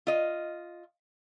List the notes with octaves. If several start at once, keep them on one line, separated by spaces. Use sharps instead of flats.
F4 D#5